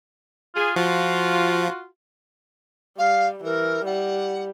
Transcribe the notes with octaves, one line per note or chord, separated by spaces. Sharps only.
F4 G#4
F3 F4 F#4
G3 F5
E3 A#4
G3 F#5